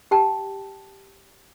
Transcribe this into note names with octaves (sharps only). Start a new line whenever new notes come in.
G4 G5 A5